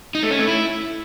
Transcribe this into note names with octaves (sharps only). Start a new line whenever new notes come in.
D#4
A3
C#4
A3
E4